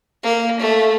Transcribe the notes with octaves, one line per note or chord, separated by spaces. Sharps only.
A#3
A3